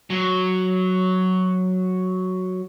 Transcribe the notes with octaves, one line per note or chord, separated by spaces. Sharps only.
F#3